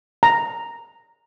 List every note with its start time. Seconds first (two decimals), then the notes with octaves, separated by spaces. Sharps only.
0.23 A#5